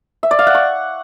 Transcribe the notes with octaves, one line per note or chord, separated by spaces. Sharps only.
E5
D5
F5
F#5
C#6